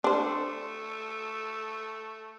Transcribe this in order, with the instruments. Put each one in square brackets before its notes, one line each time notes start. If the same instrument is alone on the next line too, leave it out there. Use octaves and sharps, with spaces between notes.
[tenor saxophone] A3 [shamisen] D4 C5